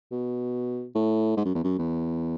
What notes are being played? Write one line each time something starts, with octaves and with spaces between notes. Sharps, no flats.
B2
A2
G#2
F#2
E2
F#2
E2